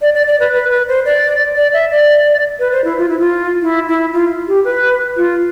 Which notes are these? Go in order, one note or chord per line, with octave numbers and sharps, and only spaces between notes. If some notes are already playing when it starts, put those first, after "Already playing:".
D5
D5
D5
B4
B4
B4
C5
D5
D5
E5
D5
B4
C5
E4
F4
E4
F4
E4
E4
F4
G4
B4
F4